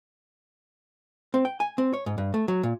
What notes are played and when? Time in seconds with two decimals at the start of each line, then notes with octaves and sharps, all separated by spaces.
1.34 C4
1.45 G5
1.60 G#5
1.78 C4
1.93 C#5
2.06 G#2
2.18 G2
2.34 A3
2.48 F#3
2.63 A#2